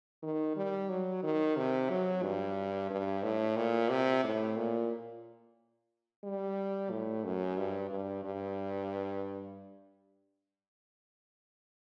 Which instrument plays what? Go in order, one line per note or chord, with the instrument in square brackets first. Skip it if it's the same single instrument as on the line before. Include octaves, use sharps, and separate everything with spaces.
[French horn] D#3
G3
F#3
D#3
C3
F#3
G2
G2
A2
A#2
C3
A2
A#2
G3
A2
F#2
G2
G2
G2